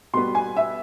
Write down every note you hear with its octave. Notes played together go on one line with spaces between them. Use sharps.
B2 G3 B3 C6
G#5
E5